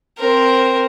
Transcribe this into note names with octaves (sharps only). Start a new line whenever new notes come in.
C4 A#4